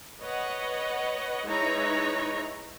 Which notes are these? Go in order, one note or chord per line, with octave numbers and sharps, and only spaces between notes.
B4 C#5 D#5 F#5
G#3 D#4 E4 B4 C#5 A#5